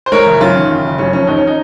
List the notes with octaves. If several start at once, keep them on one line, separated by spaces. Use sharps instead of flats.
C5
G#3 A#4 C#5
F#1
F#2 C#4 F4
D#3
F#1
F#1
F#2 C#4
F3 C#4
D#2 D#4
C#4
D#4